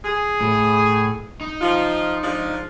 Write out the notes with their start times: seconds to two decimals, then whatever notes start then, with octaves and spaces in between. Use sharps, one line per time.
0.05 G#4
0.41 A2
1.41 D#4
1.61 F3 F4
2.23 F3 G#3 D4